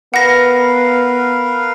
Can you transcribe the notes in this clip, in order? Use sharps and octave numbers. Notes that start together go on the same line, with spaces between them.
B3 A#4 B4 F5 F#5 A#6